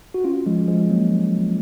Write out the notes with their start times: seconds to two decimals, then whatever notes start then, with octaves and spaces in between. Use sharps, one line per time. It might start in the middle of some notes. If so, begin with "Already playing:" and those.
0.14 F#4
0.24 C#4 F4
0.46 F3 G#3
0.68 F3 G#3
0.90 F#3 A#3